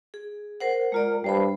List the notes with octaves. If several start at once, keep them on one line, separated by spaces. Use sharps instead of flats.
G#4
A#4 C5 F#5
G#3 F4 A#4 D5
G2 G3 C5 B5